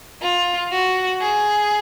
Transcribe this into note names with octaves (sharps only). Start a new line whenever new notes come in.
F4
F#4
G#4